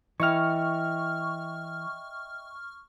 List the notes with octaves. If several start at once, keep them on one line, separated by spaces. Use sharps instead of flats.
E3 D#5 E5 G5 C#6 F6